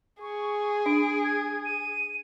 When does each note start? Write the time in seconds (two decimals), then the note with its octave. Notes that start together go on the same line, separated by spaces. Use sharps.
0.21 G#4 C#6
0.86 D4 D7
1.24 G#6
1.65 D#7